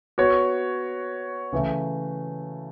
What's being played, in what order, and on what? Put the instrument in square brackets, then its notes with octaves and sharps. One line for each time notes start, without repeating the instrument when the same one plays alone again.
[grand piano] B3 F#4 C#5
C#3 E3 A3